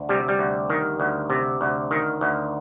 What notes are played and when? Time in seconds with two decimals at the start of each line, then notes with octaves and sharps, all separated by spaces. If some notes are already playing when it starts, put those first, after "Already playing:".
Already playing: D2
0.09 C3 G3
0.28 G3
0.39 D2
0.70 D#3
1.00 D2
1.30 C3
1.61 D2
1.91 D#3
2.21 D2